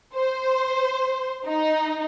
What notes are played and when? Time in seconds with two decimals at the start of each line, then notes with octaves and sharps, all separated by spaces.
0.15 C5
1.46 D#4